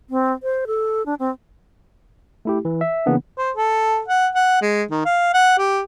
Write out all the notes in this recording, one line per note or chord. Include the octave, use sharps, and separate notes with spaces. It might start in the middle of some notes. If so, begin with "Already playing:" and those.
C4
C5
A4
D4
C4
A3 E4 G4
E3
E5
C#3 E3 A#3 B3 D4
C5
A4
F#5
F#5
G#3
D#3
F5
F#5
G4